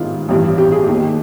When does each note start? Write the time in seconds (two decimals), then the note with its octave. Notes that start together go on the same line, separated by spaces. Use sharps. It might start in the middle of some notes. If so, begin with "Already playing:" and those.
Already playing: A1 G#2 D#3 E4 F4
0.29 A1 G2 E3
0.58 G4
0.72 G#4
0.84 D#2 D#3 G4